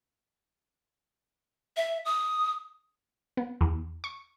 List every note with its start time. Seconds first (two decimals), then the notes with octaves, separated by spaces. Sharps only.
1.77 E5
2.05 D#6
3.37 B3
3.61 E2
4.04 C#6